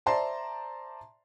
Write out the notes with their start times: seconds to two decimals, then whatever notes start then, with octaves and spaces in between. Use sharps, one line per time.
0.06 C5 D5 E5 A5 A#5 C6